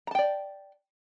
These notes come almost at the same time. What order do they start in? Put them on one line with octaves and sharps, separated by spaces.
A#5 A5 G5 D5